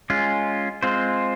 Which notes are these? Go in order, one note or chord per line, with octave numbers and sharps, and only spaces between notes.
G#3 C#4 F4
G#3 C4 F4 C5